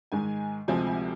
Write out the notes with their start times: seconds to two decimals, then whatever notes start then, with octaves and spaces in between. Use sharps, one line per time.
0.12 G#2 D#3 G#3 G#5
0.68 D2 C3 F3 G#3 C4 G#5
0.87 G#5